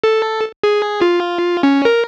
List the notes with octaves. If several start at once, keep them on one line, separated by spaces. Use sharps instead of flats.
A4
G#4
F4
C#4
A#4